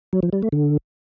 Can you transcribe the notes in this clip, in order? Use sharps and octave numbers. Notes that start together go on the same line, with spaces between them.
F#3
F3
G3
A3
D3